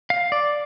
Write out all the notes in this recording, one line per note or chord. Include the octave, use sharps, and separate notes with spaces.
F5
D5